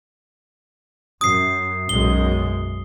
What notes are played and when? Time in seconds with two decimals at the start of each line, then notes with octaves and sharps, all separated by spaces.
1.21 F#2 D#6 C7
1.89 B1 F#2 G#3 G7